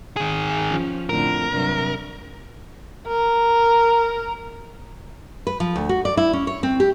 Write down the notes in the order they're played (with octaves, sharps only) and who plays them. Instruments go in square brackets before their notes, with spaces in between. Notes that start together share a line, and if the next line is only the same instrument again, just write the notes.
[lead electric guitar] D#3 G#4
[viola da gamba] F3 C#4
[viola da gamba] F2 A2 D3 [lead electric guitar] A#4
[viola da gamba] G2 C3 F#3
[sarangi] A#4
[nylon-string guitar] B4
F3
D2
F#4
D5
E4
C#4
C#5
C4
G4